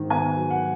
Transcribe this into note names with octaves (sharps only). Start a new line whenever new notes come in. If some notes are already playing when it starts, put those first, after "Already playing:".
Already playing: G#2 D#3
B3 G#5
F#3
F#5